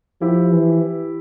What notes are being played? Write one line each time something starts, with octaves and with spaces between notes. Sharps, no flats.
F3 E4 G4
E3